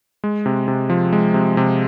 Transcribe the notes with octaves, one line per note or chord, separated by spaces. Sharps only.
G#3
C3
C3
F3
G#3
C3
C3